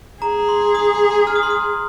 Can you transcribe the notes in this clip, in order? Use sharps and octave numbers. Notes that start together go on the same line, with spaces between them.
G#4 A#5
C6
D#6
F6
D#6
C6
D#6